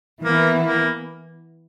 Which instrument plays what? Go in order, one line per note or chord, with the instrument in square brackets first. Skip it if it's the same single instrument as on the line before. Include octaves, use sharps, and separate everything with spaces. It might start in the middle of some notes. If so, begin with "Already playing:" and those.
[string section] E3 B3 E4 [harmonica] A#3
[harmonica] A#3